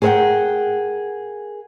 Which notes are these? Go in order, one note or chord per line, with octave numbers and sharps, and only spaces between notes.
G#4 A#4 C5 E5 F#5 G5